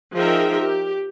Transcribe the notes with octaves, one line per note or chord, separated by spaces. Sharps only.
F3 D#4 G#4 A#4 E5 G5
G4